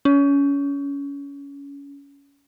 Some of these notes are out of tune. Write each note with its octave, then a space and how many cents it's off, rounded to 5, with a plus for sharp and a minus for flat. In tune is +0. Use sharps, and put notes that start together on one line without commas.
C#4 +25